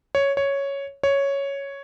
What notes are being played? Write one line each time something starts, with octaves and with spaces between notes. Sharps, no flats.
C#5
C#5
C#5